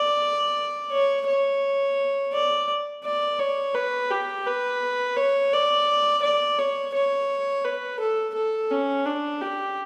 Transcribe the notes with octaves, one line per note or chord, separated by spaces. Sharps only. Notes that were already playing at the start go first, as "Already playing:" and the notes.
Already playing: D5
C#5
C#5
D5
D5
C#5
B4
G4
B4
C#5
D5
D5
C#5
C#5
B4
A4
A4
C#4
D4
G4